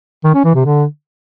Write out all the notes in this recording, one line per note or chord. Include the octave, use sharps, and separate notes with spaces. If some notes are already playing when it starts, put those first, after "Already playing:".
D#3
C#4
E3
C3
D3